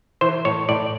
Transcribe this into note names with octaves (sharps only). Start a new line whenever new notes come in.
E3 C5
A2 C#5
A2 D5